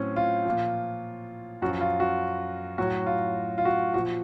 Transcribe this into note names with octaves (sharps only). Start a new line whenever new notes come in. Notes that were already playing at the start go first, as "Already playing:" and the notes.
Already playing: A2 F#3 C4 C#4
F4
A#2 F3
F#2 F3 F#4
F4
F#4
A2 F#3 F#4
F4
F4
F#4
A#2 F3 F#4